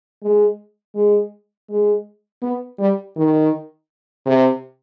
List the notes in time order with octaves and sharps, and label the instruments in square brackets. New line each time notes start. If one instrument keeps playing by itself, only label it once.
[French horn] G#3
G#3
G#3
B3
G3
D#3
C3